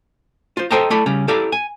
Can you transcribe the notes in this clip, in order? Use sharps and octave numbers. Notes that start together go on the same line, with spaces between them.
F4 C5
A4 C5 D#5 G5 A5 A#5
A3 E4 A4 D5 B5
C#3 G3 C#4
E4 G4 A4 D5 F5 A#5
G#5